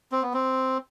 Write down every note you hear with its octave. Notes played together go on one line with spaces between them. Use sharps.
C4
B3
C4